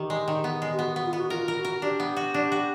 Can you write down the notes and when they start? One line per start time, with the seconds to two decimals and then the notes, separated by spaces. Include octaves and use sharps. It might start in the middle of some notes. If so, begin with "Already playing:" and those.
Already playing: D#3 G4
0.10 G#3
0.28 D#3
0.44 B3
0.62 G#3
0.73 G4
0.79 B3 F#4
0.92 F#4
0.96 B3
1.05 F4
1.13 B3 F#4
1.30 F4 A#4
1.48 A#4
1.57 F#4
1.65 A#4
1.82 D4 G4
2.00 B3
2.17 F#4
2.34 D4
2.52 F#4